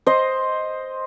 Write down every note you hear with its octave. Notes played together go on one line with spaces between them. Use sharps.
C5 D#5